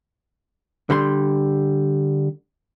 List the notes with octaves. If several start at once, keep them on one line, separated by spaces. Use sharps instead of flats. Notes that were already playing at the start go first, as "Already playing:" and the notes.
D3 G3 C6